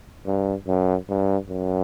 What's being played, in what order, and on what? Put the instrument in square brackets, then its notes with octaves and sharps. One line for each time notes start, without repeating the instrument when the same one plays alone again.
[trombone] G2
F#2
G2
F#2